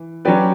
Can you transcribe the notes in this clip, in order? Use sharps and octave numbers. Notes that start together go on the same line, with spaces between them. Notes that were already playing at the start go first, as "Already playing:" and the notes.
Already playing: E3
F#3 C#4 G4 B4 D5